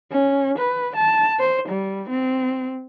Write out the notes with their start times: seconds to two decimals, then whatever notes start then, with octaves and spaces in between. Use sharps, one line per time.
0.12 C#4
0.58 B4
0.96 A5
1.39 C5
1.68 G3
2.09 C4